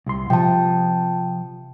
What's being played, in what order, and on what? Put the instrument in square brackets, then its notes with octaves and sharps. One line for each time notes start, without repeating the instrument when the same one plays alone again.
[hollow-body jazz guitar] C2 C6
[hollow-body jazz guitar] C3 F3 [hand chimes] G5 A5